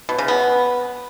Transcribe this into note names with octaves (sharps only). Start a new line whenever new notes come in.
B2
C#3
B3